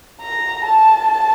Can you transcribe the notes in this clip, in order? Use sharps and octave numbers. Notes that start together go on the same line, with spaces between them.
A#5
A5